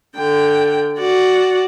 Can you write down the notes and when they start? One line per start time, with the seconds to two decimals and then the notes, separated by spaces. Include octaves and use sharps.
0.16 D3 G5
0.99 F#4 D5